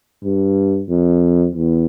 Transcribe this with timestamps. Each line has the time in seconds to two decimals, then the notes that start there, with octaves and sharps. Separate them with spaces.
0.24 G2
0.89 F2
1.55 E2